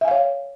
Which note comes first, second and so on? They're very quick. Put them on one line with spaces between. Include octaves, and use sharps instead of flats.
E5 G#5 F5 C#5